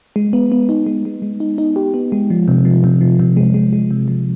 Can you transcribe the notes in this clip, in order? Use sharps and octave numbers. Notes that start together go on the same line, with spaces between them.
G#3
B3
B3
D#4
G#3
G#3
G#3
D#4
D#4
G4
B3
G#3
F3
C3
F3
C3
F3
C3
G#3
G#3
G#3
C3
F3